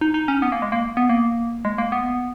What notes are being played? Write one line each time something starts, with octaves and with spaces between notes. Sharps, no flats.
D#4
D#4
C#4
B3
A#3
G#3
A#3
B3
A#3
G#3
A#3
B3